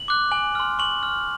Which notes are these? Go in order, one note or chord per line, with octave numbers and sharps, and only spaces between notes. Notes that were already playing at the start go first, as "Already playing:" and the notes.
Already playing: F#7
D6 F#6
G#5 F#7
C6 F6
C#6 F#7
F6